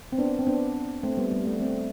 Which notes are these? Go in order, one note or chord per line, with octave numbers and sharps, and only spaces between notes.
C4
B3 D4
C4
B3 D4
A3 C4
G3 B3
G3 B3
A3
A3 C4